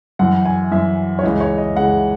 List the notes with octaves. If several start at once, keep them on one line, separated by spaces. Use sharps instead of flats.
F#2 E3 F#5
G#5
F#2 E3 E5
C#5
C#2 C#3 E3 D#5
C#5
D#5
C#2 C#3 E3 F#5